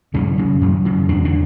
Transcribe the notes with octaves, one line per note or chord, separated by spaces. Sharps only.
F#2 C#3 C#4
C#3
F#2
C#3
E2 D4
D3 D4